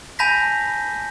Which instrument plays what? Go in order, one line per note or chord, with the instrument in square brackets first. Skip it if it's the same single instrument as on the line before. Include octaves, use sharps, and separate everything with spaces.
[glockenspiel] G#5 A5 B5 G6 A#6 B6